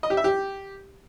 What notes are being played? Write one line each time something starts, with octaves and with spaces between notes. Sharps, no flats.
D#5
G4
E5
G4